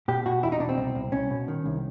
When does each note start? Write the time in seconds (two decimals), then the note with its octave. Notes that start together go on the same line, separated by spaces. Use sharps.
0.08 B2 G4
0.26 B2 F#4
0.43 E2 E4
0.52 D#4
0.60 B2 D4
0.69 C4
0.78 C2
0.95 C2
1.12 C2 C#4
1.30 B2
1.48 D#3
1.66 C2